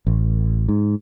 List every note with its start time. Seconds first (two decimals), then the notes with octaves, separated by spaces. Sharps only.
0.07 A1
0.69 G#2